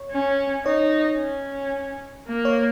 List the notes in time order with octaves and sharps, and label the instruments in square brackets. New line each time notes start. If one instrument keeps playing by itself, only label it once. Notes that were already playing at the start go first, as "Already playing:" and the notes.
Already playing: [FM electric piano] C#5
[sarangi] C#4
[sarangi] D#4 [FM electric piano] C#5
[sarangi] C#4
A#3
[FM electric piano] C#5